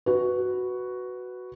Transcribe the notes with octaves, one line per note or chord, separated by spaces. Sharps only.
F#4 B4